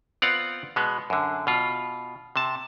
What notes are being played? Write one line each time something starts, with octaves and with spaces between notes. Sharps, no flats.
B3 C4 F4 D5 F5 F#5
B2 G#3 B3
F#2 D3
B2 F4
C3 A5